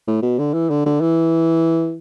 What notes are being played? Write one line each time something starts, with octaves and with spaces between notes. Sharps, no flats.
A2
B2
D3
E3
D3
D3
E3